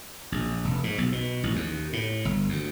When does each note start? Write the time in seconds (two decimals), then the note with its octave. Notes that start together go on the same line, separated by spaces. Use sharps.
0.32 A#1
0.65 F1
0.83 G#2
0.98 B1
1.12 B2
1.43 A1
1.56 D#2
1.93 A2
2.25 G1
2.49 D2